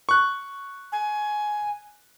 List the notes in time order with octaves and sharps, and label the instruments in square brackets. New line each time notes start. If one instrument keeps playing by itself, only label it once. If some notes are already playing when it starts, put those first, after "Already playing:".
[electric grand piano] C#6 F#6
[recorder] G#5